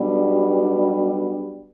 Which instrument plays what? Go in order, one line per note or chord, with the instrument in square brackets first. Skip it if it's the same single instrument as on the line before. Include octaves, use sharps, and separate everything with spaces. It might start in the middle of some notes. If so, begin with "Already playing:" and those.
Already playing: [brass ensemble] B1 B2 G3 B3 D4